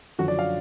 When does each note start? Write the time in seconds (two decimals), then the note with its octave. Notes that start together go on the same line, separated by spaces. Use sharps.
0.19 F#2 D3 F3 F#4
0.28 D5
0.39 F5